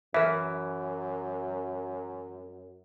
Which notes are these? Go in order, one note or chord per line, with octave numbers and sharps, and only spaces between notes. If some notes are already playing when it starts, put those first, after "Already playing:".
F#2 E3 A#4 E5